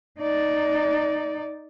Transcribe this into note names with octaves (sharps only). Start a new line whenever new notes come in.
D#4 D5